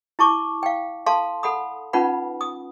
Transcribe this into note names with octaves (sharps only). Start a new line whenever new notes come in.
E4 A5 C#6 D6
F5 G5
A4 F5 A5 C6
A4 F#5 B5 D#6
C#4 D#4 F4 B4 F#5 B5
D#6